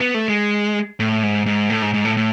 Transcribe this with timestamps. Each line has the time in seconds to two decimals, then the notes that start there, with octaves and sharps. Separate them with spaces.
0.01 B3
0.14 A3
0.28 G#3
1.00 A2
1.23 G#2
1.46 G#2
1.70 A2
1.82 G#2
1.94 G#2
2.05 A2
2.17 A2